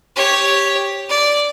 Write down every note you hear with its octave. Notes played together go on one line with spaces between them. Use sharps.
G4 C#5
D5